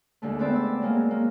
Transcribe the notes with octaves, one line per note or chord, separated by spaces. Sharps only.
D#2 D3 G#3 A3
B3 C4 D5 E5
E6
F#3 G#3 A#3
A#3